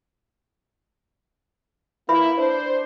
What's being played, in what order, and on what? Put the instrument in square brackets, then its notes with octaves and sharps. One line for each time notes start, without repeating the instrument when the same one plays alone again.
[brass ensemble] A#3 E4 [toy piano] B4 E5 B5
[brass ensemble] D4 C5